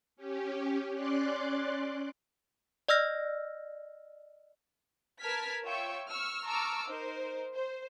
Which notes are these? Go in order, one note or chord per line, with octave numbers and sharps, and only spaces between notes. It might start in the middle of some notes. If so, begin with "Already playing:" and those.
C#4 G4
C#4 D5 C6 D6 F#6
D5 D#5 E6 F6 A#6
A#4 B4 A5 F6 G#6 B6
F4 C#5 E5 G5 C#6 E6
C#6 E6 F6
A5 A#5 C#6 D6 E6 F6
D#4 A#4 C5
C5